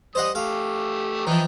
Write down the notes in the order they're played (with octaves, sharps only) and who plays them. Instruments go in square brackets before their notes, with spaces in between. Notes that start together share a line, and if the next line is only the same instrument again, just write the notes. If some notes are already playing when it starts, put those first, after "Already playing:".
[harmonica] G3 D#6 [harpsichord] C5 D#5 F#5
[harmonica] A3 G4 [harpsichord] F5
[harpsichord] E3 F3 [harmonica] D#5 G5 A#5